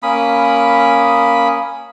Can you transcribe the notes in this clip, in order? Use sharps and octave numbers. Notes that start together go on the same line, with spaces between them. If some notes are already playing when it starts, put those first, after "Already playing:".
A#3 C#4 B5 D#6